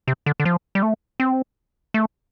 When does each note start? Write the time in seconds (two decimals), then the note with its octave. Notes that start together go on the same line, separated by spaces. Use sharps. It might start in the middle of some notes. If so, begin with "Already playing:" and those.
0.08 C3
0.26 D3
0.40 D3
0.45 F3
0.75 G3
0.83 A3
1.20 C4
1.94 A3